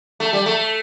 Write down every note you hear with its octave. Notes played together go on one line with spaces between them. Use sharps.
A3
G3
A3